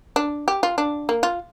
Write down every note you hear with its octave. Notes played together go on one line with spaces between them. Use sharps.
D4
G4
F4
D4
A#3
F4